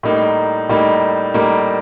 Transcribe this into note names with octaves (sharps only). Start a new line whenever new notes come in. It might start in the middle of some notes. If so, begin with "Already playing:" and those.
A2 G3 A#3 D#4
A2 G3 A#3 D#4
A2 G3 A#3 D#4